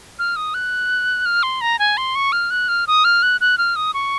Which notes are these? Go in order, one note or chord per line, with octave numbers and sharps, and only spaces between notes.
F6
D#6
F#6
F6
C6
A#5
G#5
C6
C#6
F6
F#6
F6
D#6
F6
F#6
F#6
F6
D#6
C#6